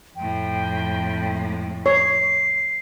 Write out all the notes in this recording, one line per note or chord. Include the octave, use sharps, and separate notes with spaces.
F2 A2 G5
C#5 C7